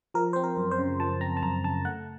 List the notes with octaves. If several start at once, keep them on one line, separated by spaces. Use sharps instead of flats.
F3 A#4
C4 C5
A#4
F#2
C5
C#3
F3 A5
C4 A#5
A5
F#2 A#5
C#3 A5
A3 F#5